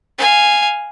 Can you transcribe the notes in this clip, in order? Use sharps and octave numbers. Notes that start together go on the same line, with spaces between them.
F5 G#5